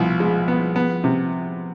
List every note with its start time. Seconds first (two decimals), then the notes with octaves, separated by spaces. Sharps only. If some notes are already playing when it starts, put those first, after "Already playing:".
Already playing: C2 B2 F3
0.20 G#3
0.48 B3
0.76 B3
1.04 C3